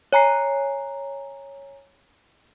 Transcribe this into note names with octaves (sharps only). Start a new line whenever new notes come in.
C#5 G#5 A#5 C7